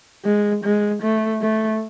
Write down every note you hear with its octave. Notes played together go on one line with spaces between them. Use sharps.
G#3
G#3
A3
A3